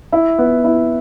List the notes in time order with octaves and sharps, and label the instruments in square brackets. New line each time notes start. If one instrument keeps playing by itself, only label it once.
[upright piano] E4
B3
E4